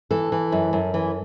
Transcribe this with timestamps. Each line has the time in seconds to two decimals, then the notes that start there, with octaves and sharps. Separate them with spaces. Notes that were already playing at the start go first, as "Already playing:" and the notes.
0.11 E3 A4
0.32 E3
0.52 F#2
0.73 F#2
0.94 E3